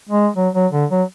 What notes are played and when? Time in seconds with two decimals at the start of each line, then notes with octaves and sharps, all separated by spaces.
0.09 G#3
0.36 F#3
0.55 F#3
0.73 D3
0.91 F#3